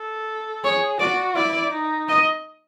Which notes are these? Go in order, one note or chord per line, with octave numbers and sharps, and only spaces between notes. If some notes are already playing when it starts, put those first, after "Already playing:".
Already playing: A4
G#4 C#5
F#4 D5
E4 D5
D#4
D#5